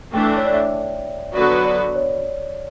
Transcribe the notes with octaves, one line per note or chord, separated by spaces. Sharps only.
E3 A3 D4 G5
C#5
D5
E5
D3 F#3 B3 F#4 B4 D5
D5
C#5